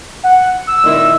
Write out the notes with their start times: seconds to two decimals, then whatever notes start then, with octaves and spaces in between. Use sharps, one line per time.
0.23 F#5
0.67 E6
0.84 A#2 D#3 E4